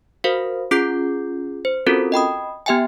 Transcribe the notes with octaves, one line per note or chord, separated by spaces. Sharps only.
F#4 A#4 C5 F5
C#4 F4 G#4 D6 G6 C7
C5
C4 C#4 F4 F#4 A4 A#4
D#5 G5 B5 D#6
B3 G4 E5 G5 G#5